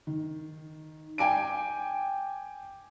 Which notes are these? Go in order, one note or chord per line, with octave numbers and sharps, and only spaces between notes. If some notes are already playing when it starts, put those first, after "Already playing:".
D#3
G5 G#5 D6 D7